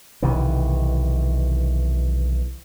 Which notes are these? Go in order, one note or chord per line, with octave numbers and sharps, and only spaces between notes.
B1 C3 D#3 E3